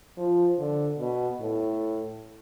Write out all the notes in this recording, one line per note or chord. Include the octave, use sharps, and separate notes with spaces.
F3
D3
B2
A2